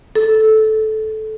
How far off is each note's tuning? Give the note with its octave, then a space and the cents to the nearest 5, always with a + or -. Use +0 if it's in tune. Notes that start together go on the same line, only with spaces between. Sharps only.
A4 -15